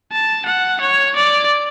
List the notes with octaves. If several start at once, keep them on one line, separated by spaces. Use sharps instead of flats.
A5
F#5
C#5
D5